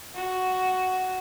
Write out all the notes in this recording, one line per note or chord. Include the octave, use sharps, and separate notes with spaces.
F#4